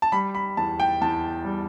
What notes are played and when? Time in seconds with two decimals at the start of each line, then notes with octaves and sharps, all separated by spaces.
0.02 A5
0.12 G3 B5
0.35 B5
0.57 E2 A5
0.80 G5
1.01 E2 A5
1.45 G3